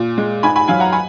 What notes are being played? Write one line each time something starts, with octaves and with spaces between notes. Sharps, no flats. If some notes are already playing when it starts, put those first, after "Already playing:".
Already playing: A#2
G#3
G#2 G#5 B5
G#5 B5
F#3 F5 G#5
F#5 A#5
G#5 B5